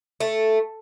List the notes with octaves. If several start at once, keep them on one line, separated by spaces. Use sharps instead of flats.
A3